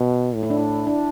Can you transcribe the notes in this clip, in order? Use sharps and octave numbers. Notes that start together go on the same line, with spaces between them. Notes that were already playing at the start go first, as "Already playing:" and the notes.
Already playing: B2
A2
E4
D4
E4
D4